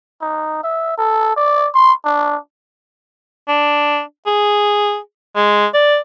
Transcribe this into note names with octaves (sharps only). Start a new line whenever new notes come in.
D#4
E5
A4
D5
C6
D4
D4
G#4
G#3
D5